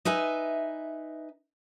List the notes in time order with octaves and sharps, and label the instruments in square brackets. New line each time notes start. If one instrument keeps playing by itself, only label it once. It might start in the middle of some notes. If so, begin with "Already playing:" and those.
[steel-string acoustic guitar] D#4 B4 E5 G#5